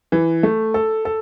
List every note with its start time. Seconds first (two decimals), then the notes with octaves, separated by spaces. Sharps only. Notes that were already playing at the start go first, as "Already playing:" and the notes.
0.12 E3
0.43 A3
0.74 A4
1.05 A4